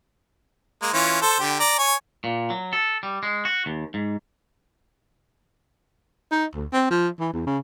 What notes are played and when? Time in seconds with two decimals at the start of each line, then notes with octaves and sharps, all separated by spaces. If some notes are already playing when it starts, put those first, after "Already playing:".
0.82 G#3 A#3
0.93 E3 C#4 F4
1.22 A4 C5
1.40 D3 G4
1.60 D5 A#5
1.79 C#5 G#5
2.24 A#2
2.50 F#3
2.73 A4
3.03 G3
3.23 G#3
3.45 F#4
3.66 D#2
3.94 G#2
6.32 D#4
6.54 D2
6.73 C4
6.91 F3
7.20 E3
7.33 E2
7.47 C#3